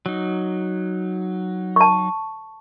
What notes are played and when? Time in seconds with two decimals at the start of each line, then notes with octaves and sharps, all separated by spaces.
0.06 F#3 D#4
1.76 A5 C#6